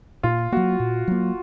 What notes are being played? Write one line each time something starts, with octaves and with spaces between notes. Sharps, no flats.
A#2 F4
F#3 A#3 F#4
A#2
F#3 A#3